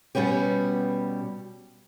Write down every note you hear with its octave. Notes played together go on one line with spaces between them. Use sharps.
B2 G3 B3 C#4 G4